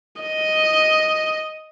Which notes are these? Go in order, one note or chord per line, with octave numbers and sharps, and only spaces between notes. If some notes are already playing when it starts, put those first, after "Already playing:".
D#5